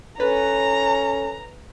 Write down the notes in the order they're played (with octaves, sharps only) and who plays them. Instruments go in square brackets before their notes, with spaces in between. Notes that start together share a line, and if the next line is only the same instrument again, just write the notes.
[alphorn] C#4 [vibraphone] A4 [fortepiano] B4 [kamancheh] A#5